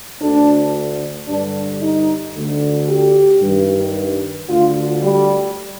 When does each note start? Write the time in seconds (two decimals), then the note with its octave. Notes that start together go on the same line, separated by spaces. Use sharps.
0.21 D2 D3 D4
1.28 G2 D3 D4
1.82 D#4
2.35 D2 D3
2.88 G4
3.42 G2 D#3
4.49 D2 D3 F4
5.03 G3